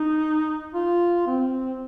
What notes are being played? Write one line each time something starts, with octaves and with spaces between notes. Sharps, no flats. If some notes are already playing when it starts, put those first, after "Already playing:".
Already playing: D#4
F4
C4